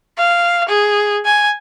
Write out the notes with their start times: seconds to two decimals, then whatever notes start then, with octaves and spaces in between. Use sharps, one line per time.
0.18 F5
0.69 G#4
1.25 G#5